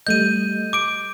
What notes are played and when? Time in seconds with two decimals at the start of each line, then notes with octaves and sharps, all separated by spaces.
0.07 G3 A3 D#5 G6 D#7
0.73 D6 D7